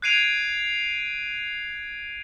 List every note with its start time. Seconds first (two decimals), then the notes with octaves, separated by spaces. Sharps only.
0.02 F#6 G#6 C7 D7 D#7 F7